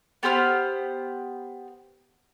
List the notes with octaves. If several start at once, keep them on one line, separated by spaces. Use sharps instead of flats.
B3 G4 C5 F6